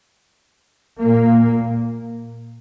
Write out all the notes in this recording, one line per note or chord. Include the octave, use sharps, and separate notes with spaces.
A#2 A#3